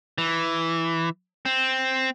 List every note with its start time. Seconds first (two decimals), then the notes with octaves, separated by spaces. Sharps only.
0.18 E3
1.45 C4